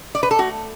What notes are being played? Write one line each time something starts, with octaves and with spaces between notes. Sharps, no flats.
D5
B4
A4
A3 F#4